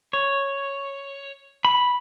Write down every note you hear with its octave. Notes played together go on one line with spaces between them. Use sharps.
C#5
B5